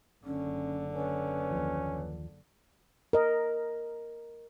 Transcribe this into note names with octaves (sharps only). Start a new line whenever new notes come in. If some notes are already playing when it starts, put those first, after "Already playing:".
F#1 D3 C#4
C#4 B4
D#2 F3
A#4 D#5